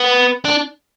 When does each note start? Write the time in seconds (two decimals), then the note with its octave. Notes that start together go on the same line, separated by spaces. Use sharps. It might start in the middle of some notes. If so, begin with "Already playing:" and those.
Already playing: B3
0.45 D4